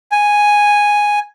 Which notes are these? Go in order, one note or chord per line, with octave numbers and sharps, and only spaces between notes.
G#5